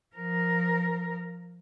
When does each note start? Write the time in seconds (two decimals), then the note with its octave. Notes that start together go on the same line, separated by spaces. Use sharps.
0.15 F3 A#4